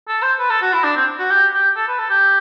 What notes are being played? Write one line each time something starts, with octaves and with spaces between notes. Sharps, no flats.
A4
C5
B4
A4
F#4
E4
D4
C4
F#4
G4
G4
A4
B4
A4
G4